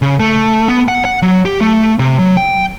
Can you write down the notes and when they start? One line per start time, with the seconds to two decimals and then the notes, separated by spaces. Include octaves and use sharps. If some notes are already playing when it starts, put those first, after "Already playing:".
0.02 C#3
0.20 A3
0.68 B3
0.88 F#5
1.05 F#5
1.22 F#3
1.45 G4
1.61 A3
1.99 C3
2.19 F#3
2.37 G5